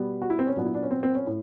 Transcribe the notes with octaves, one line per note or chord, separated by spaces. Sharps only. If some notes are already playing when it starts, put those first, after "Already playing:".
Already playing: B2 G3 B3
F#4
E4
C4
C#4
A#2 F#3 B3 D4
E4
D4
C#4
C4
C4
C#4
A2